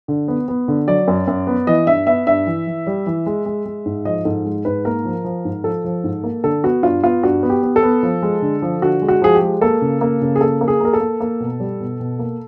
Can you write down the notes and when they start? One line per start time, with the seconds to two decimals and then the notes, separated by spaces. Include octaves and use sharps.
0.08 D3
0.28 B3
0.48 B3
0.68 D3
0.87 F#3 D5
1.08 F#2
1.27 F#2
1.47 B3
1.67 E3 D#5
1.87 G2 E5
2.07 B3 E5
2.27 G2 E5
2.47 E3
2.67 E3
2.87 G3
3.06 E3
3.26 G#3
3.46 G#3
3.66 G#3
3.86 G#2
4.05 F3 D#5
4.25 G#2 A4
4.45 G#3
4.65 G#2 B4
4.85 A#3 A#4
5.05 F3
5.24 F3
5.45 G#2
5.64 F3 A4
5.84 F3
6.04 G#2
6.24 A#3
6.44 D3 A4
6.64 B3 F#4
6.83 G2 F4
7.03 B3 F4
7.23 G2 F#4
7.43 B3
7.50 G4
7.63 B3
7.76 A4
7.83 B3
8.03 F3
8.22 G#3
8.42 D3
8.62 F3
8.82 D3 F#4
9.02 G#3
9.08 F#4
9.22 F3 G#4
9.35 G4
9.42 G#3
9.61 A#3 A4
9.82 C#3
10.01 A#3
10.21 C#3
10.36 G#4
10.41 A#3 A4
10.61 A#3
10.68 G#4
10.81 A#3 A#4
10.93 A4
11.01 A#3
11.20 A#3
11.40 B2
11.60 G3
11.80 B2
12.00 B2
12.19 A#3